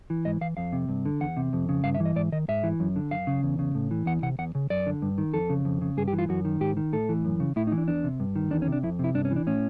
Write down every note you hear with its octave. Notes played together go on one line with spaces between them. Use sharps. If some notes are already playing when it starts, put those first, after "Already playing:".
E3
G#2 D#5
E3 F5
F2 F5
C3
G2
D3
E2 F#5
C3
F2
C#3
G2 F5
E5
E3
D#5
G#2 D5
D#3 D#5
G#2 E5
E3
F#2
D3
F#2 F5
C#3
E2
C#3
A2
E3
E2 F#5
C3 F#5
E2 F#5
C#3
F#2 D5
D3
G2
D#3
F2 A4
C#3
F2
C#3
G2 G#4
G4
E3
F4
F#2 F#4
D#3
G#2 G4
D#3
A2 A4
E3
F#2
C#3
A2 E4
D#4
E3
D4
E2 D4
C3
G2
D#3
E2 D4
C#4
C3
D4
F2 E4
C3 E4
G2 D4
C#4
E3
D4
A2 C#4